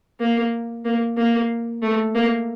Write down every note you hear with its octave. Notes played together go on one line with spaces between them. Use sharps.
A#3
A#3
A#3
A3
A#3